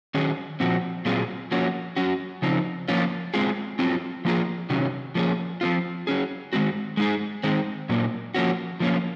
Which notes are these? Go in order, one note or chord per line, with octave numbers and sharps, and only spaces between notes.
D#3 F#3 C#4 G#4
A#2 F3 C4 F#4
A#2 F#3 C4 F4 G#4
F3 A#3 C#4 F#4
F#3 C#4 F#4
C#3 F3 C4 D#4
F3 A#3 C#4 F4
G#3 C4 F4 G#4
F#3 C4 F4
F3 A#3 F4 G#4
C3 D#3 F#3 C#4
F3 A#3 C#4 G#4
F3 C4 F4
F#3 C#4 G#4
D#3 G#3 C4 F#4
G#3 D#4 G#4
D#3 G#3 C4
A#2 F#3 A#3
F3 A#3 C#4 F#4
F3 A#3 C#4